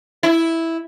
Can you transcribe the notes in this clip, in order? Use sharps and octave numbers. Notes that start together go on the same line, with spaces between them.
E4